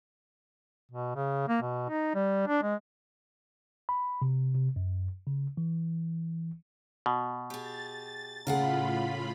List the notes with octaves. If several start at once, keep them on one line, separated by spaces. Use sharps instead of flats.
B2
C#3
A#3
B2
D#4
G3
D4
G#3
B5
C3
C3
F#2
C#3
E3
B2
G4 G#4 A6
A2 C#3 F4 G#4 A#4 F5 F#5 B5